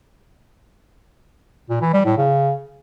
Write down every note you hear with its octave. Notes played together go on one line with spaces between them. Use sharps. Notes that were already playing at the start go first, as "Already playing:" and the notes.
A#2
E3
G3
A2
C#3